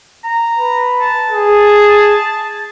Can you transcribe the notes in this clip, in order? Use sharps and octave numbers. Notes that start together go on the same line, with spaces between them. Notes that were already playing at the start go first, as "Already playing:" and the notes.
A#5
B4
A5
G#4